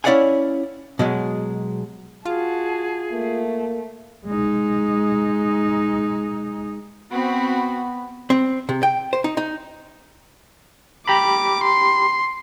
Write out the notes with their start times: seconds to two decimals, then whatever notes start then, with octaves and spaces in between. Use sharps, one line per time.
0.04 C#4 E4 D5 F5 F#5 G#5
0.99 B2 F#3 G#3
2.26 F4 F#4 G#4 A5
3.12 A3 A#3
4.26 G#3 D#4
7.12 B3 C4 F#4 B5
8.30 C4
8.69 C3
8.83 G5
9.13 C5
9.24 D#4
9.37 D#4
11.08 G4 A#5 B5 D6
11.64 C6